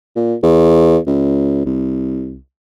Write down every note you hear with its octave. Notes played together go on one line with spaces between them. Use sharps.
A#2
E2
C#2
C2